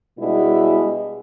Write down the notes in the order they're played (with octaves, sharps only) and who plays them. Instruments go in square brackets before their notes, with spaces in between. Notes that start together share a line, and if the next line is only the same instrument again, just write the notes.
[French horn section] B2 G3 G#3 D4 E4